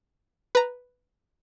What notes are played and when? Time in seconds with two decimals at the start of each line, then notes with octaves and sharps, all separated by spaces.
0.55 B4 A#5